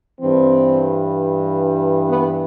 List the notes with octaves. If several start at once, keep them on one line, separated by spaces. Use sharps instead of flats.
G2 E3 C4
B3